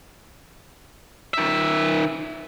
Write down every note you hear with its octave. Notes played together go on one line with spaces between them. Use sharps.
D#3 E5